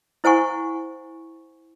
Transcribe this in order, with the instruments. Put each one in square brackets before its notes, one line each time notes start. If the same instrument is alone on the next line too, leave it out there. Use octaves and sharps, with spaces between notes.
[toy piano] E4 C5 F#5 G#5 C#6